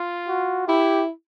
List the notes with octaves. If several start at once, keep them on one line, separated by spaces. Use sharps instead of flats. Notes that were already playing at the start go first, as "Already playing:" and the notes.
Already playing: F4
F#4
E4 G4